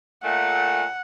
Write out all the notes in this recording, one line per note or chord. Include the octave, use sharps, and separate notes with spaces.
A#2 A3 F#5